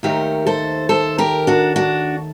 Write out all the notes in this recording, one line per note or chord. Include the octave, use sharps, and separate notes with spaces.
D#2 D#3 A3 G4 A#4
A4 C5
A4 C5
G4 A#4
D4 F#4
D4 F#4